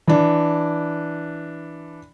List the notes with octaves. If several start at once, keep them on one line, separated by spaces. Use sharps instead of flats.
E3 D4